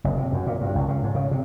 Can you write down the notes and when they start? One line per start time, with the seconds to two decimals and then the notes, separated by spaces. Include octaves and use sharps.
0.04 F#1
0.18 C3
0.33 F#2
0.47 A#2
0.61 G2
0.75 C#2
0.88 C#3
1.03 G#2
1.15 C#3
1.31 C3